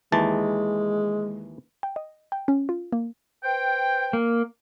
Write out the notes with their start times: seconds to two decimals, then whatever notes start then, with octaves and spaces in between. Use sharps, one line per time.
0.12 D#2 E3 G#3 A5
1.83 G5
1.96 D#5
2.32 G5
2.48 C#4
2.69 F4
2.93 A#3
3.43 B4 C5 G5
4.13 A#3